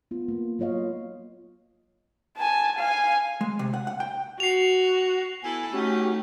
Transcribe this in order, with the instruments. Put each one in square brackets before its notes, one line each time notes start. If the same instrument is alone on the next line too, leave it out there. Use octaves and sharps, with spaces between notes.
[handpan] B3 F4
A#3
F#3 F4 C#5 D#5 F5
[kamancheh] G#5 A5
F5 G#5
[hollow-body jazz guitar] G#3
C3
F#5
F#5
G5
[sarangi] F#4 [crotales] C7 F7
[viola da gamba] B3 E4 A4 [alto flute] G#5
[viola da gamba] A3 D#4 [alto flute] C#4 [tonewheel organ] F#4 G4